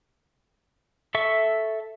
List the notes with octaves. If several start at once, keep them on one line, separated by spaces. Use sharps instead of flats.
A4 E5 C#6